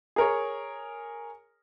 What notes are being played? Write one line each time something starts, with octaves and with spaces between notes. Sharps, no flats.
G#4 A#4 C#5